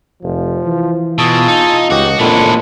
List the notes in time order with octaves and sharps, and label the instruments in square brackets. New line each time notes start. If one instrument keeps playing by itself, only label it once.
[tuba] F1 [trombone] F3
[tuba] E3
[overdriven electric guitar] B2 [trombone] F4 [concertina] G#4 A5 E6
[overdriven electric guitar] D#4
[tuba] C#2 [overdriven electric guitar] F#4 [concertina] G4 D#5
[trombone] F2 [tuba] A#2 [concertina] G#3 D4 E4 [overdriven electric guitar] A3 C#4